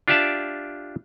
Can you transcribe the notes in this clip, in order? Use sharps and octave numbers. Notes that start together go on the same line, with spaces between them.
D4 F4 G4 D5 E5 A5